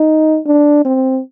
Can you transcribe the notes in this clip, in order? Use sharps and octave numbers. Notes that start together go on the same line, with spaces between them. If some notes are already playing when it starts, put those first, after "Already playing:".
Already playing: D#4
D4
C4